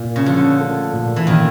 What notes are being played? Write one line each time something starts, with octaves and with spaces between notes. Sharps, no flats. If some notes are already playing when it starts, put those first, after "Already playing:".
Already playing: A#2
C#3
D3 F3
A3
A#2
E3
A#2 D#3